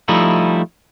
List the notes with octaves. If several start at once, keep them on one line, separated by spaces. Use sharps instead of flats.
F3 G3 A3 D#4 E4